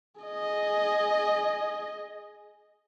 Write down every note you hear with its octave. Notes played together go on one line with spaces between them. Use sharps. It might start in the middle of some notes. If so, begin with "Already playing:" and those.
G#4 D#5